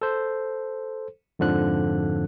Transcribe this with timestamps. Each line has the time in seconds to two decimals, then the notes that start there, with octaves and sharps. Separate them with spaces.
0.01 A4 C5
1.39 F2 G#2 D3 F3 F#6